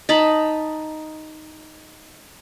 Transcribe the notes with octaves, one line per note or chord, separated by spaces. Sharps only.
D#4 D#5 A5 B5